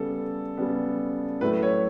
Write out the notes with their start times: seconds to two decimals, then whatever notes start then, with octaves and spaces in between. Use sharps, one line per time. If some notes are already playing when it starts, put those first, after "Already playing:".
Already playing: C#3 G3 B3 A4
0.57 C#3 G3 B3
1.41 A2 F#3 A3 B4
1.63 C#5